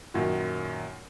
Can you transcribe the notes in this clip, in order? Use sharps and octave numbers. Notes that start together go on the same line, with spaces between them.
F#2 A#2 D#3 F#4